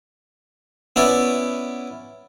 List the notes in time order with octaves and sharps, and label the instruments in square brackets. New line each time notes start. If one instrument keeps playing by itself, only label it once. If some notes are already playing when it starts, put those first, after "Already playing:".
[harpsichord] B3 C#4 E4 D5